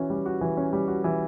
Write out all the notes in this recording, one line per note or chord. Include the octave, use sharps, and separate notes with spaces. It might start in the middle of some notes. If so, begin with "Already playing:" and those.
Already playing: E3 C#4 F#4
G3
F#4
E3
C#4
G3
F#4
E3